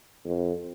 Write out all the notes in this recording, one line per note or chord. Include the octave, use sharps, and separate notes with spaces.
F2